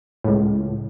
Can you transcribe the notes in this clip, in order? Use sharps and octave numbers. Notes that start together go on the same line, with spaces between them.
C#2 A2